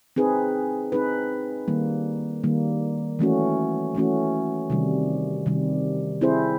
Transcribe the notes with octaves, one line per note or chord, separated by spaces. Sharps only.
C4 D#4 G#4 B4
C4 D#4 G#4 B4
D#3 G3 A#3
D#3 G3 A#3
E3 A3 C#4 F#4
E3 A3 C#4 F#4
C3 D#3 G3
C3 D#3 G3
C4 E4 G#4 C5